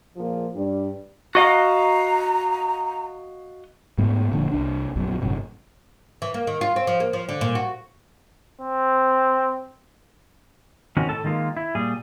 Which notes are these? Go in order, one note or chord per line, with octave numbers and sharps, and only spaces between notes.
A#2 F3 A#3 G#4
G2 G3 D4
F#4 D#5 F5 A#5
G#2 G#3 A3 B3
E1 A#2 D3 F3
C2 D4
A#1 F#2 B2
G1 F#2 A2 C3
E3
A#3
D#3
F4
C4
F3
A#3
F3
D3
A#2
F#4
C4
D#3 C4 C#4 F#4
A2 A4 A5
D#3 G#3 A#3 F4
E4
A#2 G3 G#4